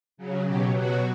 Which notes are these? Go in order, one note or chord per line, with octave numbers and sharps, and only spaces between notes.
C#3 F#3
B2 F#3 G4
B2 F#3 F#4